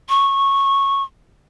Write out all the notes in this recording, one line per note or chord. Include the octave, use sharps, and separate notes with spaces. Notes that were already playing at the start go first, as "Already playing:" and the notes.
C#6